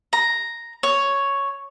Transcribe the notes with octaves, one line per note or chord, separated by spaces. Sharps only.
A#5
C#5